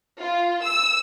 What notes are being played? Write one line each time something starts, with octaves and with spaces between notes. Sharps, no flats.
F4
E6